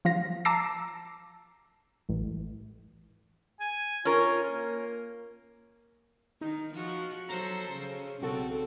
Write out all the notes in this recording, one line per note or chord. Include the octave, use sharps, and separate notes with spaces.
F3 F5 A#6
A5 A#5 D6 E6 A#6 C7
A1
G#5
C#4 F4 A#4
A#3
D#3 D#4
F3 F#4
F#3 A4 C5 A#5
C#3
B1 C#3 C4 F#4 A4